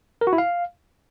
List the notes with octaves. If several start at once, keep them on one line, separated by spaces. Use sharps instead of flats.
A#4
F#4
E4
F5